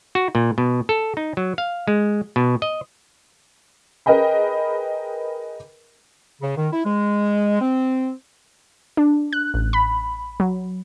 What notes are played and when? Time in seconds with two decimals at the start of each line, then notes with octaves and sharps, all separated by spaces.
0.15 F#4
0.35 A#2
0.58 B2
0.89 A4
1.17 D#4
1.37 F#3
1.58 F5
1.88 G#3
2.36 B2
2.62 D#5
4.06 G#4 A#4 B4 D#5 G5 B5
6.42 C#3
6.57 D#3
6.73 E4
6.85 G#3
7.61 C4
8.97 D4
9.33 F#6
9.54 A1
9.73 B5
10.40 F#3